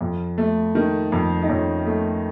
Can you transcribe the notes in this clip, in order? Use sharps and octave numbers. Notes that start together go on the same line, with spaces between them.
F2
A3
D#3
F2
D#4
F2 C#4
A3